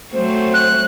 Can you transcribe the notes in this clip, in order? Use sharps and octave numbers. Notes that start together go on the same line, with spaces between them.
F#3 A3 C4 C5
F#6